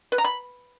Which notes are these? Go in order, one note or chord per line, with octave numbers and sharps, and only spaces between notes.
B4
A#5
B5